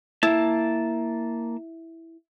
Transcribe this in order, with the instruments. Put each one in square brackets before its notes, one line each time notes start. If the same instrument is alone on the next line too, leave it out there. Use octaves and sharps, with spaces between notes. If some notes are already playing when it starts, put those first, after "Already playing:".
[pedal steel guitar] A#3 A5 [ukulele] E4